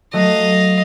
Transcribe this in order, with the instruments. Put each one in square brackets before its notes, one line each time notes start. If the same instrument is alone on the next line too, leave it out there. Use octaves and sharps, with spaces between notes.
[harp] F#3 A3 F#4 [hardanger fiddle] D#5 F5